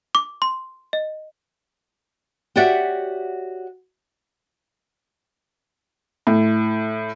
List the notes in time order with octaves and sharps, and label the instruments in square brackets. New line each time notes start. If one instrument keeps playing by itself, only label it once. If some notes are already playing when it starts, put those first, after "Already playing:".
[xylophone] D6
C6
D#5
[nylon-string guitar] F#4 G4 C#5 D5 E5 F#5
[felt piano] A2